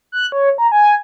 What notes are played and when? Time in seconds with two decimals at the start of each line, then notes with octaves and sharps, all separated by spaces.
0.12 F#6
0.32 C#5
0.58 A#5
0.72 G#5